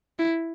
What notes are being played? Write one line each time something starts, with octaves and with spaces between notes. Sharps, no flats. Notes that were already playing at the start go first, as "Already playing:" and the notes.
E4